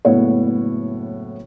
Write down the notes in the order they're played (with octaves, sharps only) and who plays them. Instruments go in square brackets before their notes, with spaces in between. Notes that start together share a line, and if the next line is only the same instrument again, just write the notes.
[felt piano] F#1 A2 B3 C#5